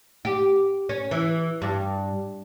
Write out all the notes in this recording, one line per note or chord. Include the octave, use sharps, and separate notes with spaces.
G4
C#4
E3
G2